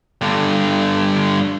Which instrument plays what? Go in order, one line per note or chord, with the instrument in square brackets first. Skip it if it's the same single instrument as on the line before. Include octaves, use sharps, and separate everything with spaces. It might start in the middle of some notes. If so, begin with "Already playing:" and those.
[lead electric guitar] G2 D3